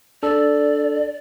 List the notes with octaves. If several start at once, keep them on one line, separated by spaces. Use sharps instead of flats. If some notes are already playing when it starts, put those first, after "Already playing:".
D4 A4 D5